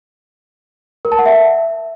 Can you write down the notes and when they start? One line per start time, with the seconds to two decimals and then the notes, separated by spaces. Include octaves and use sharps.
1.05 A#4
1.12 A5
1.19 F#5
1.26 E5